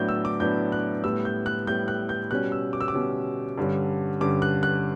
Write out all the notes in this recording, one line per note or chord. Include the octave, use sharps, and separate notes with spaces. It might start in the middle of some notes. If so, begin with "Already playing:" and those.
Already playing: A2 F#3 B3 D4 G6
E6
D6
A2 F#3 B3 D4 G6
F#6
A2 G3 B3 E6
G6
F#6
A2 G3 B3 G6
F#6
G6
B2 G3 C#4 F#6
E6
D6
E6
D6
B2 G3 C#4
G2 D3 G3 C#4
G2 D3 G3 C#4 D6
F#6
F#6